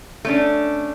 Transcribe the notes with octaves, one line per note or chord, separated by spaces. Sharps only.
A3 C#4 D4